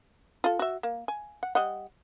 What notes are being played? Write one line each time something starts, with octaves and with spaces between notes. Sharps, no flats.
F4 A4
F#4 E5
A#3
G#5
F#5
G3 D#5 F#5